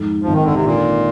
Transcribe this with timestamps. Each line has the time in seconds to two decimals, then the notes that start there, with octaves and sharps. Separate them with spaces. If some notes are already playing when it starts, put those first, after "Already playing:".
Already playing: F2 G#2
0.22 G#1 F3
0.33 D#3
0.44 D3
0.54 C3
0.65 A#2 D3